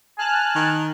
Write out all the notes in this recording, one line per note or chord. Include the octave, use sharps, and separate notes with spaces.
G#5 A5 F6 F#6
D#3